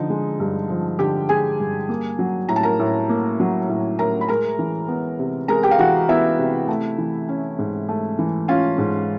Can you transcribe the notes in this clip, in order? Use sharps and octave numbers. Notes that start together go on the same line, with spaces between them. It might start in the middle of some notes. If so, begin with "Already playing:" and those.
Already playing: D3 F3 D#4
G#3
G2
F3
D3 G4 G5
G#3 G#4 G#5
G2
A#3
F#3
A2 A#5
A5
A#4 A#5
A2
A#3
F#3
A2
A2 A#4 A#5
B5
G#3 A#4 A#5
E3
B3
C3
G#3 A#4 A#5
G4 G5
F5
E3 F#4 F#5
B3 E4 E5
C3
A3
E3
C#4
G#2
A3
E3
C#4 F4 F5
G#2